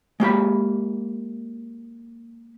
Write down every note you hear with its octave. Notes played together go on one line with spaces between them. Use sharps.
G#3 A#3 G4 B5